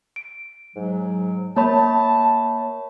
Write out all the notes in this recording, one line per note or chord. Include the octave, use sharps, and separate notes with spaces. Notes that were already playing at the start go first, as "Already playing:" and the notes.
D7
G#2 F#3
A#3 C#5 A5 B5